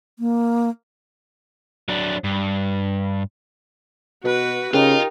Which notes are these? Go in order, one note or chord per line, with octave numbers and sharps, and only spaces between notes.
A#3
F#3 D4
G2
B2 F#4 B4
C#3 D#4 F4 G4 A#4 G5